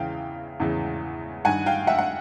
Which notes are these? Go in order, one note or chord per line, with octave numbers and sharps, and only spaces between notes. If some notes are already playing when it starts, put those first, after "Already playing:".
Already playing: E2 C#3 E3 F5 G5
E2 C#3 E3
G2 D#3 F#5 G#5
F5 G5
E5 F#5
F#5